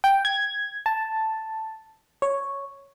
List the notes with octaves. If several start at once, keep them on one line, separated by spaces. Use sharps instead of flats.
G5
G#6
A5
C#5